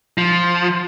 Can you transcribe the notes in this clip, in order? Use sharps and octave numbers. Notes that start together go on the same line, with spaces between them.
F3